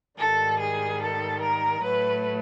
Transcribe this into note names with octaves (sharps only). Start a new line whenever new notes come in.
G#2 D#3 G3 A4
G#4
A4
A#4
A2 F#3 A3 B4